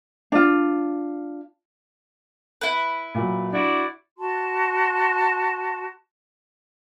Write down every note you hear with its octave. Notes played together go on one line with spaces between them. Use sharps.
D4 F4
E4 B4
A#2 F#3
D4 E4 F#4 D5
F#4 A5 C6